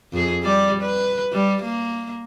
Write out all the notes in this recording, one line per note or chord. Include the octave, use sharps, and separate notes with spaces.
F2 G#4
G3 D5
B4
G3
A#3